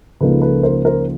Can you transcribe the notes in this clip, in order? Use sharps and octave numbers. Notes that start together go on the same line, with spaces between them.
C#2 C#3 F3 A#3 D#4 A4 B4
A4 B4
A#4 C5
A#4 C5